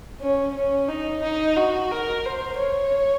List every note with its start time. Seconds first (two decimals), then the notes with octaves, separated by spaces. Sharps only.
0.21 C#4
0.54 C#4
0.89 D#4
1.23 D#4
1.56 F#4
1.91 A#4
2.25 C5
2.59 C#5